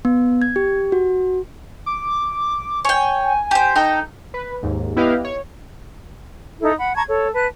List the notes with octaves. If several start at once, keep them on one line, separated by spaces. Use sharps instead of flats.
B3
G#6
G4
F#4
D6
C#5 G5 G#5
G4 C5
D#4 A4 G5
B4
D#2 G#2
B3 E4 G4 B4 D#5 F5
C#5
D#4 E4 A4
F#5 B5
A5 A#5 C#6 G#6
A4 C#5
B4 A5 F#6